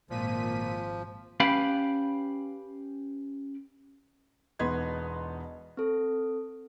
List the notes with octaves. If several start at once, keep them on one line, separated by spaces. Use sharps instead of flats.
G#1 A#2 F3 B6 D#7
C#4 G4 B4 F5 G5 B5
E1 B3 D#4 B4 C6 G#6
C4 A4